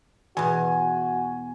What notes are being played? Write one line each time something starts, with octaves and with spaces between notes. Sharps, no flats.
E2 B2 F#4 G#5